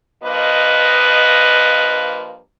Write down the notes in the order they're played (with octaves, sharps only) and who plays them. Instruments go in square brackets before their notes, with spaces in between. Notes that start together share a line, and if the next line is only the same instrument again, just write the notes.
[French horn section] G2 F3 A#3 B4 D#5